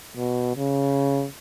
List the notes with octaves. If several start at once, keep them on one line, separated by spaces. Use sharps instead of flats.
B2
C#3